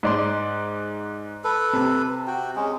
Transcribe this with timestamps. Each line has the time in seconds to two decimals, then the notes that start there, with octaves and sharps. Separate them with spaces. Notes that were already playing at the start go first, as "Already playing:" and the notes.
0.03 G#2 D5 C6
1.44 A4 B4
1.73 C3
2.27 F#4 G5
2.56 G#3 C#4